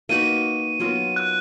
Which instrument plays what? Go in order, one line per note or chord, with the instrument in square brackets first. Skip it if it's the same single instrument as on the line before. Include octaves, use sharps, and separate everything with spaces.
[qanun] A#3 D#4 F#4 B4 [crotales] D#7
[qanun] F#3 B3 F4 A#4
[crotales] F#6